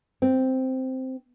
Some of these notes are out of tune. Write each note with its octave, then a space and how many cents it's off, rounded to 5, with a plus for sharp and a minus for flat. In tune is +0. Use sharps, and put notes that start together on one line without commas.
C4 -5